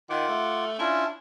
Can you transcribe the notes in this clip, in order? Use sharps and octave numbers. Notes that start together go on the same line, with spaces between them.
D#3 F4 F#5 D6
A3
C#4 D4 E4 F4